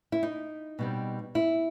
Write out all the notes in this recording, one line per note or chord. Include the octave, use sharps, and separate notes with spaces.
E4
D#4
B2 G3 C4
E4